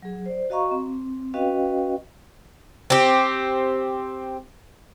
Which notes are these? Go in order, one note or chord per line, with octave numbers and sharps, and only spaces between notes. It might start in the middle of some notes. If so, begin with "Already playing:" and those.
F#3 G#4
C5 D5
F#4 D#5 F5 A#5 C#6
C4
C#4 F#4 B4 D#5 F5 G5
C4 G4